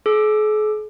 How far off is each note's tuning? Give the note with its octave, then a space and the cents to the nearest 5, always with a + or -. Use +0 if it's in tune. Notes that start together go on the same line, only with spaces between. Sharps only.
G#4 +45 E6 +0